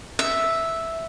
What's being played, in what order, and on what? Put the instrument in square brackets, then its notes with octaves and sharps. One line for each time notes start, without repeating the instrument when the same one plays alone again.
[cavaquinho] E5